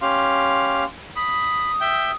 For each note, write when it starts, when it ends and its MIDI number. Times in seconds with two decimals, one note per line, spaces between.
0.01 0.84 61
0.01 0.84 67
0.01 0.84 77
0.01 0.87 84
1.16 1.71 83
1.16 2.16 87
1.81 2.11 76
1.81 2.11 79
1.81 2.11 91